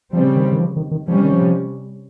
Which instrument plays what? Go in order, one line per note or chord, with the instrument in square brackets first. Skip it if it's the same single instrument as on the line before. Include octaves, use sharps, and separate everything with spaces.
[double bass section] C#3 G3 C4 [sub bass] F3
[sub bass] D#3
D#3
F3
D#3
D#3
[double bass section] C3 G3 C#4 [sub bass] F3
[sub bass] D#3
F3